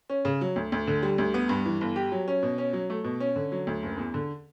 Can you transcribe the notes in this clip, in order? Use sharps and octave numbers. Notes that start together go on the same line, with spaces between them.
C#4
C#3
F#3
D2
D2
D3
G3
D2
B3
G2
E3
G1
G4
F#3
C#4
B2
C#4
F#3
A3
B2
C#4
D3
F#3
D2
F#1
E2
D3